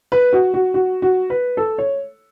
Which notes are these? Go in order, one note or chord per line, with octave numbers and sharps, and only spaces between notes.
B4
F#4
F#4
F#4
F#4
B4
A4
C#5